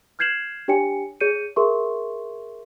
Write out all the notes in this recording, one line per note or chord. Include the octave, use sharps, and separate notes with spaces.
F6 G6 G#6 C7 E7 F#7
D4 G4 C#5 G5 G#5 C#7
G#4 C#5 G6 C#7 D#7
G#4 A#4 E5 C6 C#6